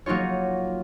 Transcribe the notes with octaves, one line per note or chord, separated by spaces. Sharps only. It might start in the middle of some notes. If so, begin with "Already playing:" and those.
F#3 A#3 D#4 F4 C#5